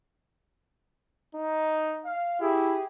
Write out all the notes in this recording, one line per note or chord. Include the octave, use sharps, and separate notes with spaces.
D#4
F5
E4 G4 G#4